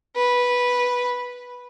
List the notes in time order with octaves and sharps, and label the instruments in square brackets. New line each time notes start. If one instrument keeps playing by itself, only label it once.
[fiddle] B4